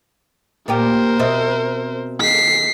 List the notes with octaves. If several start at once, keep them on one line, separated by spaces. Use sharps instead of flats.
A#2 A#3 G4 A#4 C5
B2 C4 E5
D#2 B6 C7